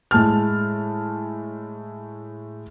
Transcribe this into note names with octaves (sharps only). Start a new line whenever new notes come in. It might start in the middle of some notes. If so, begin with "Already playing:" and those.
A2 G#3 A5 F6